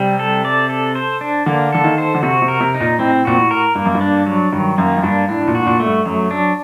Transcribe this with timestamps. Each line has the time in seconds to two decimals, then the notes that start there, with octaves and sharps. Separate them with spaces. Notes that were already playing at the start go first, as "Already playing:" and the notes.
Already playing: C3 G3
0.19 A4
0.45 D5
0.69 A4
0.95 C5
1.21 D4
1.46 D3 A#3
1.73 D3 A4
1.84 D#3
1.98 C5
2.15 D3
2.23 C3 F#4
2.42 C3
2.48 A#4
2.61 C3
2.74 D#4
2.80 A#2
2.99 A2 C4
3.25 A#2 F#4
3.38 A2
3.51 A#4
3.75 G2 A#3
3.85 F#2
3.95 G2
4.01 D4
4.26 F#3
4.53 G2 D#3
4.78 F#2 A#3
4.97 F#2
5.03 G2 D4
5.29 A2 D4
5.42 A2
5.47 A#2
5.55 F#4
5.60 A2
5.67 A#2
5.80 A3
5.86 G2
6.05 F#2 F#3
6.31 D4